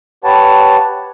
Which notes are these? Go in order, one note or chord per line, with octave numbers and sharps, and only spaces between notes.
G4 B4 C#5 F#5 A5